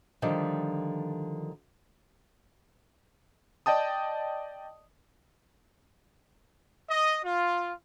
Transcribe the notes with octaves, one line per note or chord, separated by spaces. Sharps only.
D3 D#3 F3 G3
D5 D#5 G5 A5 D#6
D#5
F4